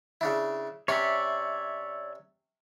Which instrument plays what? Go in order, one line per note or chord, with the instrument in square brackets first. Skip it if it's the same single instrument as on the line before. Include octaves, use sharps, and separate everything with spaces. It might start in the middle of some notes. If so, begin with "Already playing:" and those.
[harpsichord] C#3 D4 E4
[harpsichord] C3 C#4 C6 [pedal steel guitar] C#5 D5 E5